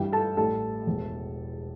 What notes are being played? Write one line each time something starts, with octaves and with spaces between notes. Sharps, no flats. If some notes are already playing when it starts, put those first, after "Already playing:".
Already playing: G2 E3 G3 G4 G5
A4 A5
A1 A2 G3 E4 A4 A5
E1 E2 E3